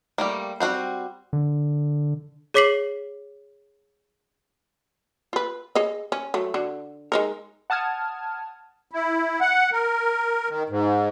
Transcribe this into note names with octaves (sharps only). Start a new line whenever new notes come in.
G3 A3 A#3
G3 C4 F4 F#4 C5
D3
G#4 C#5 D6 B6 C7 F#7
F4 B4
G#4 C#5 D#5
C#4
F#3 A3
D3 F#4
G#3 D#4 A#4
F#5 A5 D#6 F6 G#6
E4
F#5
A#4
D#3
G#2